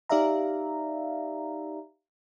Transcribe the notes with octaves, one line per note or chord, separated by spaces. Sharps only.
D#4 G4 D5 E5 F5 A#5